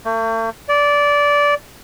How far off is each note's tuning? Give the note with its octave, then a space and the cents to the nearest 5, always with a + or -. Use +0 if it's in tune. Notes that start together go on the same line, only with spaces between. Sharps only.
A3 +45
D5 -15